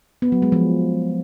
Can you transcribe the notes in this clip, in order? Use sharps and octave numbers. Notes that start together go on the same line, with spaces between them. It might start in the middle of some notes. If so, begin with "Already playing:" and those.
B3
F#3
G#3
F3